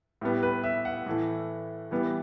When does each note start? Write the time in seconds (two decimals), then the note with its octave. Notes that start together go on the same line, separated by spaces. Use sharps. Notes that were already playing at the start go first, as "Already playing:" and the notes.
0.21 A2 G3 B3
0.43 B4
0.64 E5
0.85 F#5
1.06 A2 E3 A3
1.91 E3 G3 B3